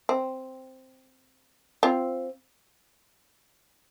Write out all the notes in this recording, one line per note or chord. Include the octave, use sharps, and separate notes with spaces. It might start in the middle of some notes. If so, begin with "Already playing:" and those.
C4
C4 F4